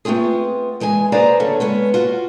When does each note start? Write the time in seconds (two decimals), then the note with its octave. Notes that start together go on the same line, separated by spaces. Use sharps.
0.05 A3 B3 C4 F4 G#4
0.80 E3 G#3 G#4 G#5
1.12 G#4 B4 C5 D5 F5 A#5
1.40 D3 F#3 A3 C#4
1.60 G#3 B3 C#4
1.94 F4 F#4